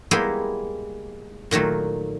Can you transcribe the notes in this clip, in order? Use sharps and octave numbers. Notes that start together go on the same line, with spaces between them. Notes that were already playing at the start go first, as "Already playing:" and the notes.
G3 G#3 A#3 B3 E4 G4
A#2 D#3 F#3 A3